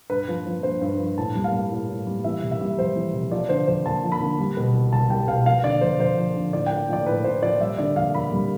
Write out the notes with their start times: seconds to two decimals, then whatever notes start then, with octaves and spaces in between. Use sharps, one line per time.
0.10 G2 B4
0.28 F3
0.46 F3
0.63 G2 C5
0.81 G2
1.00 F3
1.18 A2 A5
1.35 G3
1.44 F5
1.53 G3
1.71 A2
1.89 A2
2.07 G3
2.24 E3 E5
2.42 C3
2.51 E5
2.61 G3
2.78 F2 C5
2.96 E3
3.13 C3
3.32 F3 D5
3.49 D3 C5
3.67 F2 C5
3.85 F2 A5
4.04 F3
4.12 B5
4.21 D3
4.38 G3
4.57 B2
4.74 C2
4.93 C2 A5
5.10 G3 G5
5.28 B2 F5
5.46 F3 F5
5.63 D3 D5
5.81 F2 C5
6.00 F2 C5
6.18 F3
6.35 D3
6.53 A2 D5
6.66 F3 G5
6.89 F3 D5
7.06 A2 B4
7.24 A2 C5
7.42 F3 D5
7.60 G3 E5
7.78 D3 D5
7.96 F2 F5
8.14 F2 B5
8.32 G3